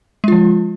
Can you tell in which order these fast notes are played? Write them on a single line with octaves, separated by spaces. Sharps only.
G#3 F4 F3